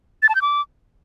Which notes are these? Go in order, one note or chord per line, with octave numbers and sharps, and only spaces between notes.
A6
A5
G6
D6